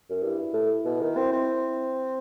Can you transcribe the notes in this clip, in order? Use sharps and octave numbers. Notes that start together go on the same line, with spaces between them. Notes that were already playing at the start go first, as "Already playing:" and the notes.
F#2
G2 E4
A2
B2
D#3
C4
C4